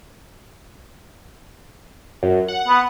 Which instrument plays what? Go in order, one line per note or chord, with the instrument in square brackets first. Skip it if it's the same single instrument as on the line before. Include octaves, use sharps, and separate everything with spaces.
[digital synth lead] F#2
F#5
[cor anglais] B3